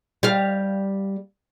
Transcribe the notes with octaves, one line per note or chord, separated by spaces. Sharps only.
G3 F5